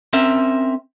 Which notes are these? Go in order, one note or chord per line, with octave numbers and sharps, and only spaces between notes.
C4 C#4 A#4 E5